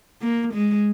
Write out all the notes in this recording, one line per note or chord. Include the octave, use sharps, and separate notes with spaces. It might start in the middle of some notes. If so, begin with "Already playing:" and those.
A#3
G#3